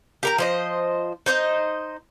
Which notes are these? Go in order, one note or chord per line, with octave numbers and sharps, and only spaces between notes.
G4 A#4 A#5
F3 C5 D#5
D#4 C5 C#5 D#5